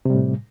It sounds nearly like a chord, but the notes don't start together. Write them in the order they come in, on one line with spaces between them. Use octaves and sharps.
C3 G3 A2